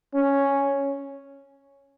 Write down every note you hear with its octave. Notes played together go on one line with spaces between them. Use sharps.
C#4